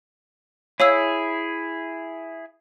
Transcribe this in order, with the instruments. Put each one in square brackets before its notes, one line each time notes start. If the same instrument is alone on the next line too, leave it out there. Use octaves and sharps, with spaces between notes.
[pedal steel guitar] E4 G#4 [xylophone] C#5 F5 E6